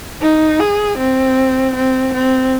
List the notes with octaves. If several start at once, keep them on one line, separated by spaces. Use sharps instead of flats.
D#4
G#4
C4
C4
C4